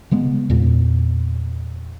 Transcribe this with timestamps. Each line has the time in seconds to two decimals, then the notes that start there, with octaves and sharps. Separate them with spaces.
0.11 C#3 G#3 B3
0.50 E2 A#2